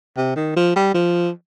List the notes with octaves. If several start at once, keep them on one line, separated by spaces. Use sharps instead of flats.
C3
D#3
F3
G3
F3